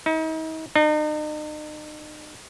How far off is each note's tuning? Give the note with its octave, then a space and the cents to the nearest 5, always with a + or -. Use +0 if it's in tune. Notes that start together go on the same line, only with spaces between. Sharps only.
D#4 +40
D#4 -40